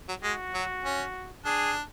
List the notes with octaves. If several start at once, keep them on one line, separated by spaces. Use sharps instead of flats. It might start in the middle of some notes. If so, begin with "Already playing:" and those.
F#3
G#3 F#4
F#3
C#4
D4 G#4